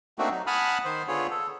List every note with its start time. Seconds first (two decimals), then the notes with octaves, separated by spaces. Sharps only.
0.19 A3 A#3 C4 D4 D#4 F#4
0.31 F#3 D#4
0.47 F#5 G#5 A5 B5 D#6 F6
0.85 D#3 C5
1.08 D3 B3 F4 G#4 C#5
1.30 A4